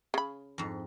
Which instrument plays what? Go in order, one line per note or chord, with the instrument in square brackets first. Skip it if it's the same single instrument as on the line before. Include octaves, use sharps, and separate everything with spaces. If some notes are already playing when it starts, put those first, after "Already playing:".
[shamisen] C#3 B5
[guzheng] F2 G#2